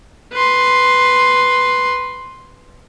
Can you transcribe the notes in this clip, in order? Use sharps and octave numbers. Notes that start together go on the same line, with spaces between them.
B4 C6